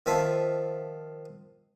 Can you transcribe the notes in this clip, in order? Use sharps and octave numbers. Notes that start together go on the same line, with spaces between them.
D#3 F3 C4 E5 A5